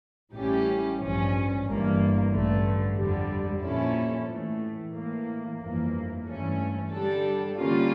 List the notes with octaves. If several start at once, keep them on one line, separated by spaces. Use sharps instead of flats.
A1 A2 G3 C#4 G4
A1 G2 F3 C#4
G1 G2 E3 A#3
A1 G2 D3 A3
F2 D3 G3
A#2 F3 C#4 E4 A4
A2 E3 A3
A2 E3 A#3
G1 F2 E3 A#3
G2 E3 A3 C#4
D3 G3 D4 A4
D3 G3 A#3 C#4 F4